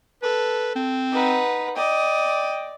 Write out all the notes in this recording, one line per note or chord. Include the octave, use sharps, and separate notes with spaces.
A4 B4
C4
D#4 B4 F#5
D5 D#5 G5